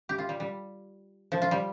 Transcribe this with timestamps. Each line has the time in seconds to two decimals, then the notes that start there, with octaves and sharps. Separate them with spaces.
0.09 G4
0.18 F4
0.29 G3
0.40 G3
1.32 F3
1.42 F4
1.51 G3